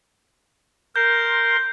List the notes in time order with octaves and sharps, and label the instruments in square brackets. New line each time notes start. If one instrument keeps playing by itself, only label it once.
[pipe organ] A#4 C6 [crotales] G6